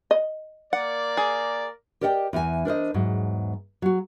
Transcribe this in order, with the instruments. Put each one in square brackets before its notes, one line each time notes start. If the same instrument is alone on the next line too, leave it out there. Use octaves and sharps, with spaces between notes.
[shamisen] D#5
[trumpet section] A#3 A#4 D5 [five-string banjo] F#5
[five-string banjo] G#4
[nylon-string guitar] G4 A#4 D5 D#5 F#5 G5
E2 E3 D5 G#5
D4 A#4 C5 D#5
E2 G#2 F#3
F#3 F#4